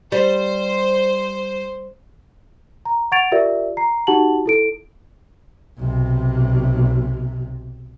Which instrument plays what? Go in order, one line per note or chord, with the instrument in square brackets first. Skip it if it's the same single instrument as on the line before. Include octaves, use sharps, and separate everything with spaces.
[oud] G3 [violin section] C5
[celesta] A#5
F#5 C#6 G#6 A6 D7 F7
F4 G4 A#4 D5 E5
A#5 C7
D#4 F#4 G4 F#5 A5 F#7
E4 A4 D7
[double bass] B1 C3